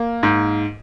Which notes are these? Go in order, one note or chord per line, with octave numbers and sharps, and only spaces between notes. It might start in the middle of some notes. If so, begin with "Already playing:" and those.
Already playing: A#3
G#2